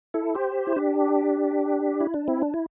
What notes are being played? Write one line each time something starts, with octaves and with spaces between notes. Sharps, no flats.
E4 A4
G4 C5
E4
D4 G4
E4
D4
C4 E4
D4
E4